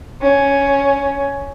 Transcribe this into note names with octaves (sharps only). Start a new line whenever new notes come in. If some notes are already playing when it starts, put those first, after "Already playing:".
C#4